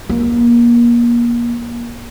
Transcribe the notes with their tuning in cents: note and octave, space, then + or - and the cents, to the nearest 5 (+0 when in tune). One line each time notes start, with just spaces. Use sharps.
A#3 +30